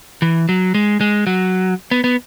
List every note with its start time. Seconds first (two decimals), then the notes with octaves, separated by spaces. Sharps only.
0.22 E3
0.49 F#3
0.75 G#3
1.01 G#3
1.27 F#3
1.91 B3
2.04 B3